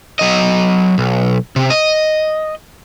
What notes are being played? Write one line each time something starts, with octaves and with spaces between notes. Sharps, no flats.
F#3 D#5
B1
C3
D#5